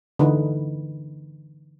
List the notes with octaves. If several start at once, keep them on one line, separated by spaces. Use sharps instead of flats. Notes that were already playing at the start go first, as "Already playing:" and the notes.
D3 E3 D#4 B4